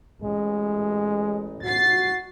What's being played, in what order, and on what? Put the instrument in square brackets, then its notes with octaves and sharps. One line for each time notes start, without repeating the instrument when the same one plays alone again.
[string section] A1 [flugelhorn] G#3
[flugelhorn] F#4 [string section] A6 C7